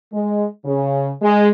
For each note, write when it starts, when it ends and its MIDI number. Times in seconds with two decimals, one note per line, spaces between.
0.13 0.47 56
0.66 1.11 49
1.22 1.49 56